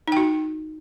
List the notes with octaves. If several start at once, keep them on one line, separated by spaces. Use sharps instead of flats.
D#4 F#4 G5